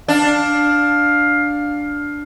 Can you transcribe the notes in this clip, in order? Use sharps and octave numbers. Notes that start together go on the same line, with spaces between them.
D4 F5